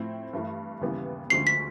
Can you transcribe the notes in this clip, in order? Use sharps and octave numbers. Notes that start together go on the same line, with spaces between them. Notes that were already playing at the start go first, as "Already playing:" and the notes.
Already playing: A2 F3 A3 C4 E4
G2 E3 A3
D#2 C#3 E3 G3 B3
D2 D3 F3 G#3 C#4 C7
B6